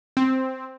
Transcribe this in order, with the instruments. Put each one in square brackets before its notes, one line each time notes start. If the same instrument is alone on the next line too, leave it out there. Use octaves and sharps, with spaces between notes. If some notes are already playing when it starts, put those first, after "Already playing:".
[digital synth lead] C4